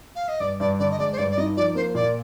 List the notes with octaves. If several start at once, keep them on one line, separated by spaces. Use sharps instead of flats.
F5
D#5
G2 D5
G2 D5
D3 D5
D#5
G#3 D5
C5
G2 D5
D5
D#4 D#5
F3 D5
A#3 C5
A#2 D5